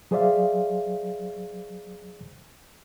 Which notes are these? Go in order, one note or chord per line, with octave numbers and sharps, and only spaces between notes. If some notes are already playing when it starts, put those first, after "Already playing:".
F#3 G#4 C5 D5 E5 F5